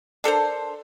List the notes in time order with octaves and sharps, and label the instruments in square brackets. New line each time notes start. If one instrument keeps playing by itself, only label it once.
[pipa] D4 A4 A#4 C5